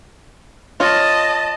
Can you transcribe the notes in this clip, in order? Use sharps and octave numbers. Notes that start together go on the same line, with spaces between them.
F4 C#5 D#5 A5